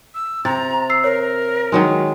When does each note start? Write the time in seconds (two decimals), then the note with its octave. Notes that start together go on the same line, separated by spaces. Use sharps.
0.15 E6
0.45 C3 A#5 A6
0.90 E6 C7
1.04 A#4 C#5
1.72 D#3 F#3 G#3